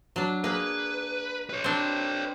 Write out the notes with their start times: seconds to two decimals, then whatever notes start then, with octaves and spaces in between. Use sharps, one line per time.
0.16 F#3 D4
0.44 A#3 G#4 B4
1.50 B4 C#5
1.64 C4 D4